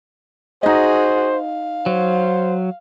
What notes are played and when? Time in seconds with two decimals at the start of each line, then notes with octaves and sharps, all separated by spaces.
0.63 D#4 F#4 G#4 C5 D#5
1.35 F5
1.86 F#3 C5